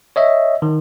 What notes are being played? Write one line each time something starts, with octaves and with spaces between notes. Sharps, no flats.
C#5 D#5 E5
D#3